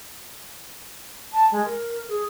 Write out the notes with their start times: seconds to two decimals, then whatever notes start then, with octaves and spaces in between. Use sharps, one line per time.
1.33 A5
1.52 G#3
1.65 A#4
2.09 G#4